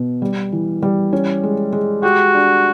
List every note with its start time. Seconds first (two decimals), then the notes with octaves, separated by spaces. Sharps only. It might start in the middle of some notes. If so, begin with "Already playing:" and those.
Already playing: B2
0.22 G3
0.52 E3
0.82 G3
1.13 C#4
1.43 G#3
1.72 G#3
2.03 F#4 G4
2.34 D4